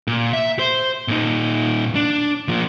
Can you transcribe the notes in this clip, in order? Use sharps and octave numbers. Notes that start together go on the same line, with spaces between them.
A#2
E5
C5
A#2 D#4
D4
F3 A#3